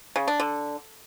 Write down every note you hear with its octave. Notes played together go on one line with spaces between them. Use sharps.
C#3
D4
D3